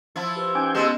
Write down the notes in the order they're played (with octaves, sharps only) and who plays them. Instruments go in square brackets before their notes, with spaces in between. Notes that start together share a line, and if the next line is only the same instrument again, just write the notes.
[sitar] F3 E4
[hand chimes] G4 B4 C5
[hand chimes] C#4 D#4 [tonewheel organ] G5 G#5 D6
[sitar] B2 G#3 [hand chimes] B3 D#5 [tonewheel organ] G4 C6 E6